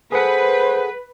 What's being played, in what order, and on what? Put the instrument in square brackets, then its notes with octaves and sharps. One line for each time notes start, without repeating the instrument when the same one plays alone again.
[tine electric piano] G#4 A4 F#5 [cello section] B4 [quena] C5